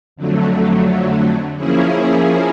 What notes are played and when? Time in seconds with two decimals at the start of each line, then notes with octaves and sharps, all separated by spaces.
0.16 F2 D3 F#3 A3
1.57 F3 A#3 C#4 E4 G#4